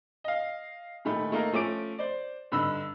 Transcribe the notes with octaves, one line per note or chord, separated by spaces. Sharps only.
D#5 F5
D#1 D#3 A3 B5
A3 A#3 D#4 A#4
F3 A3 C#4 D6 D7
C5 D5
G2 D3 D#4 B5 E6